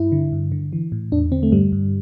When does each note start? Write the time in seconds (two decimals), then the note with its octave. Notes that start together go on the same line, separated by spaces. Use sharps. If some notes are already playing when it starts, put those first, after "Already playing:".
Already playing: G2 E4
0.12 D3
0.32 G2
0.52 D3
0.73 E3
0.92 A2
1.12 E2 D4
1.32 D3 C4
1.43 A3
1.52 G2 G3
1.72 G2